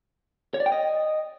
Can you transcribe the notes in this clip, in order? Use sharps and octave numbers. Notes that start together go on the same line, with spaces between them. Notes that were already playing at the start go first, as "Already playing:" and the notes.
C#5
D5
G5
D#5